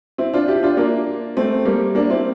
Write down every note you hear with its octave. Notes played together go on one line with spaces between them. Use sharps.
C4 E4
D4 F4
E4 G4
D4 F4
A#3 D4
A3 C4
G3 A#3
A#3 D4
C4 E4